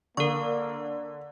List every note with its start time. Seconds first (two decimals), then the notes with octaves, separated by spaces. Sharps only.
0.17 D3 A#3 A#4 C#6